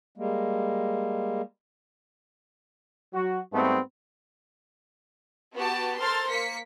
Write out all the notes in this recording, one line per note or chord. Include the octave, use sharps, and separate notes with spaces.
G3 G#3 A#3
F#3 F#4
G#2 G3 A3 B3 C4
B3 F#4 G4 A5
A4 A#4 C5 C6 F6 A6
A#3 B6 C#7